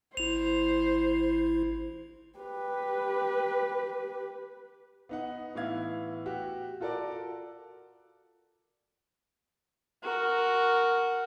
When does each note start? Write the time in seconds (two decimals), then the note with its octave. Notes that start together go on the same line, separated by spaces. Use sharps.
0.17 G#1 E4 C5 F7
2.39 G4 B4
5.09 B3 D#4 F#5
5.55 A2 E3 B3 E4 F5 G#6
6.26 F#4 G4
6.80 F4 F#4 A4 A#4 D5
10.03 F#4 A#4